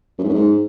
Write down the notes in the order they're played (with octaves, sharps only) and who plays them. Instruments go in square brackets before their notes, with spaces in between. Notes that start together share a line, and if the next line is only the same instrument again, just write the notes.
[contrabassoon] F#2
G#2
F#2
G#2